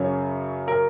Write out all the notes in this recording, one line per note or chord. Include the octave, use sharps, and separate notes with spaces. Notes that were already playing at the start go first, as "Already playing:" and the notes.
Already playing: F#2 C#3 C#5
A#4